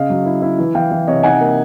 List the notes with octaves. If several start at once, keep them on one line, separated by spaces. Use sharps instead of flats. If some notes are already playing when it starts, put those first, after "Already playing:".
Already playing: C#3 D#5 F5
F#3
E4
E4
E3
E3 F5 G5
E3
C3 C#5 D#5
D#4 F#5 G#5
A#3